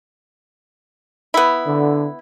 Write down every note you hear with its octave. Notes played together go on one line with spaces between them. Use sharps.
B3 E4
D3